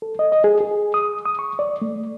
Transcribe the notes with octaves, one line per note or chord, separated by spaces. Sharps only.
A4
D#5
D#5
G#4
G#4
D#6
D#6
C#6
D5
A3